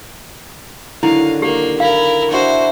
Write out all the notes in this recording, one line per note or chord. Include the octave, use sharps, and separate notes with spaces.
D3 D#3 F#3 E4 F5
A#3 G4
E4 A#4 F5
D4 E4 F#4 C5